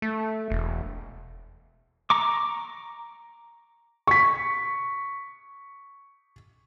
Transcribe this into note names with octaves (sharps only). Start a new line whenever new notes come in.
A3
E1
A#5 C#6 D6
C#6 B6